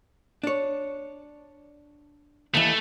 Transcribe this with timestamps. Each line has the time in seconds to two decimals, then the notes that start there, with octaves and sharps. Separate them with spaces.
0.44 D4 C#5
2.55 D#2 E3 A3